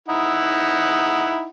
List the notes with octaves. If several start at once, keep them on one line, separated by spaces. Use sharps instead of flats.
D#4 E4 F#5